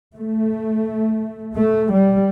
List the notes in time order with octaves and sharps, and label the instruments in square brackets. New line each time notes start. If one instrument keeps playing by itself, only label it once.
[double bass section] A3
A3
G3